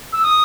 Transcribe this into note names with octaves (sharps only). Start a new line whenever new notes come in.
E6
D#6